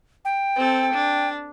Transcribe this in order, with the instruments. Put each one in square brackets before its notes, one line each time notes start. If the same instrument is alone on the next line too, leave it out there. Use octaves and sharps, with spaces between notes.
[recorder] G5
[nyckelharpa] C4 A4
D4